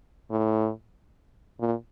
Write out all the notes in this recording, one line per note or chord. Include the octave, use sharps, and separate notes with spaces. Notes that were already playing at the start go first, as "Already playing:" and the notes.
A2
A#2